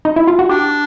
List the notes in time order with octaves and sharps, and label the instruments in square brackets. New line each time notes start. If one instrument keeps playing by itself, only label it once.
[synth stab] D#4
E4
F4
F#4
[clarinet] D4 [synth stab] G4